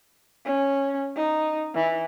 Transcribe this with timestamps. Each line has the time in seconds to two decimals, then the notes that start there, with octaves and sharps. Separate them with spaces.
0.45 C#4
1.16 D#4
1.75 E3